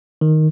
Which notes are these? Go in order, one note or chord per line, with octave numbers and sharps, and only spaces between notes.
D#3